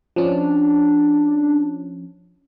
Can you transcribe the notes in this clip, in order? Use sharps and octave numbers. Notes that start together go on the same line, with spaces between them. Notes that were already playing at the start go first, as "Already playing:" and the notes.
F3 C#4 D4